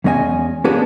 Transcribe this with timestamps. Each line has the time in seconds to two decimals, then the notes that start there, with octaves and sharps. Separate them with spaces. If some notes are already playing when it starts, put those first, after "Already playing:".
0.04 E2 G#3 C#4 D#5 G5 G#5
0.64 A#3 B3 C#4 D4 G4 G#4